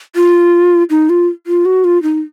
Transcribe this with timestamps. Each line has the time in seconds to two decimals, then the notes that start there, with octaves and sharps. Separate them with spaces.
0.16 F4
0.90 D#4
1.09 F4
1.47 F4
1.65 F#4
1.84 F4
2.03 D#4